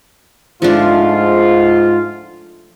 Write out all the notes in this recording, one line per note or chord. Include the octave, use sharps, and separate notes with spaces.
G#2 F3 A3 D4 F4